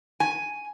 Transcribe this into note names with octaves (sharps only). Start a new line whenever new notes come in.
G#5